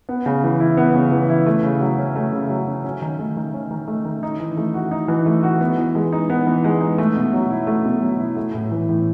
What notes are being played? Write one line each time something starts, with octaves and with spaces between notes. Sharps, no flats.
B3
C#3
E3
E4
B3
C#3
E3
E4
A3
C#3
F#3
C#4
A3
C#3
F#3
C#4
C#4
D#3
A3
D#3
C#4
D#3
A3
D#3
D#4
E3
A3
F#4
D#4
E3
A3
F#4
B3
E3
G#3
D#4
B3
E3
G#3
D#4
A3
B2
F#3
E4
A3
B2
F#3
E4
A3
A2
E3
A2